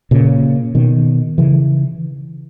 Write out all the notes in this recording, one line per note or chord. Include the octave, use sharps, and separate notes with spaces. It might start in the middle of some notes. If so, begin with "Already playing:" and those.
A#2 C#3
B2 D#3
C#3 E3